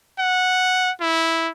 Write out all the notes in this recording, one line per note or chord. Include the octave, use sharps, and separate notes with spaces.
F#5
E4